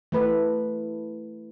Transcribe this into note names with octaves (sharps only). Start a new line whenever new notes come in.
E3 A3 B4